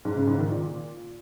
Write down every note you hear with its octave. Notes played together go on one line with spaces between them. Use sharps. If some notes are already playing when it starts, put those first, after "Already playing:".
G#2
C#3
G#2
D#3
A#2